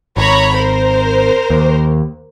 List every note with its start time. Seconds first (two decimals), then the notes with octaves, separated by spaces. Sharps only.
0.17 G#1 C#5 A#5 B5
0.55 A#4 C5
1.50 D#2